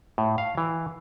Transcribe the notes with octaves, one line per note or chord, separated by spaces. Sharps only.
A2
F5
E3